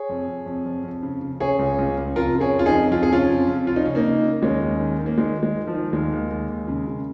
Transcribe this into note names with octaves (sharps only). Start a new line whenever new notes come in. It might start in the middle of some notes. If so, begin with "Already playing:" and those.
Already playing: G#4 C#5
F2
F2
F2
F2
F2
C#3
C#3
C#3 G#4 C#5
C#2
C#2
C#2
F2 F4 A#4
C#3
G#4 C#5
F2
F4
D#4 G#4
F2
F2 F4
G#4
C#3 C#4 F4
F2
F2
C#3 F4
D#4
C#3 C#4
A#3 D#4
C#3
C#3
D#2 G#3 C#4
D#2
D#3
D#3
A#3
D#3 G#3
D#3
G#3
D#3
F3
D#3
D#2 G#3
D#2
D#2
D#2
C#3
C#3